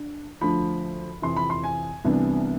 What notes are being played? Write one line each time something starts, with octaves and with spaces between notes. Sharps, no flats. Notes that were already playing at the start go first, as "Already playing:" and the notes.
Already playing: D4
D2 D3 F3 B5
F2 C3 E3 C6
B5
C6
G#5
C2 C3 E3 B3 D4